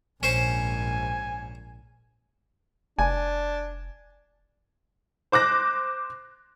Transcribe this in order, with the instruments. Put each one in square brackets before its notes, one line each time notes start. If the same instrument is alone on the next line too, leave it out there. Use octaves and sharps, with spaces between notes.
[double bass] A#1 G#2 [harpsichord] C#4 C5 [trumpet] G#5
[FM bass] F1 [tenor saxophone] D4 [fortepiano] G#5
[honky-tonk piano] C5 D6 F#6 A#6